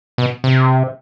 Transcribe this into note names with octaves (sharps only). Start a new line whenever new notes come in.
B2
C3